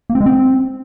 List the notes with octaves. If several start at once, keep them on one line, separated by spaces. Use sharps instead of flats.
A#3
C4
G#3
C4